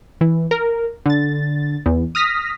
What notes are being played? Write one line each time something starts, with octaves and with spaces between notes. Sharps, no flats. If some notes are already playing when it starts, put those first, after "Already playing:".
E3
A#4
D3 A6
E2
D#6 F6 A#6 B6